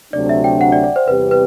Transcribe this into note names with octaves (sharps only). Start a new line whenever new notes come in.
D2 C3 F#3 A3 D4 D5
E5
G5
F#5
D5
D5
C5
E2 C3 G3 C4 G4 B4
B4